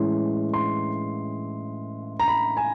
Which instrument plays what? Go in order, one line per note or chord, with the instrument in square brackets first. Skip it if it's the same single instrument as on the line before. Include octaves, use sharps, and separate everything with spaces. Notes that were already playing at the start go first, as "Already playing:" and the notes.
Already playing: [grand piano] A2 E3 G#3 C#4 C6
C6
A#5
B5
G#5